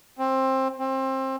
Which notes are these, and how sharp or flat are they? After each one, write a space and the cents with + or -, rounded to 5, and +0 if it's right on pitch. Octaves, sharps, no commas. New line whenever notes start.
C4 +20
C4 +25